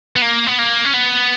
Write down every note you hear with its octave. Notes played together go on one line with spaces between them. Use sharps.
B3
A#3
B3
A#3
C#4
B3